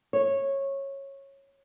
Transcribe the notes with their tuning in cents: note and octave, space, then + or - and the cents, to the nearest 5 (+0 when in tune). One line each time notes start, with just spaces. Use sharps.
C#5 -15